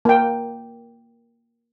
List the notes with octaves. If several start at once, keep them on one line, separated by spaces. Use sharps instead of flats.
A#3 G5